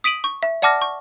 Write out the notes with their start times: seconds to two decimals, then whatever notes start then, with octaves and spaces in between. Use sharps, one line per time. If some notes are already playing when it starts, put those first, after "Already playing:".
0.04 D#6 B6 D7 D#7 F#7
0.24 C#6
0.43 E5
0.62 D5 F#5 A5 D6 F6 A#6
0.82 C#6